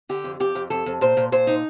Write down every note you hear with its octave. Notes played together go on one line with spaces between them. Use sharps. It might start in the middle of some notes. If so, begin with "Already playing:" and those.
D3 G4
F2
F2 G4
F2
F2 A4
F2
A#2 C5
A#2
A#2 C5
D#4